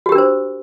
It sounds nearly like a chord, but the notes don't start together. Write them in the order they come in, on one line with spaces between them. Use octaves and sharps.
F#4 G4 A#4 D4 C5